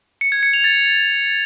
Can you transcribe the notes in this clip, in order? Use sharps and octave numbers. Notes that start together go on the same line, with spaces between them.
C#7
G#6
C#7
F7
A6